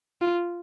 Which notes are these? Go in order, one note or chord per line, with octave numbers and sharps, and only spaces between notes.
F4